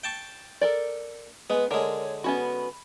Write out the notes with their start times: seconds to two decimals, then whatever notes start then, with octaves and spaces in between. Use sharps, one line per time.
0.03 G5 A5 C#6
0.61 A4 A#4 D5
1.50 G#3 B3 B4
1.71 D3 G#3 A#4 C#5
2.24 B3 C#4 F#4 B5